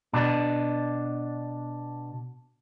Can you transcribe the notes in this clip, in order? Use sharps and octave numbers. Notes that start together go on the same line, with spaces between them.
B2 D4